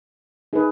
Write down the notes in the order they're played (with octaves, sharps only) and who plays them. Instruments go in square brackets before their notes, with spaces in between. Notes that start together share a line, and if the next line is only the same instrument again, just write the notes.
[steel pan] D#4 G#4 B4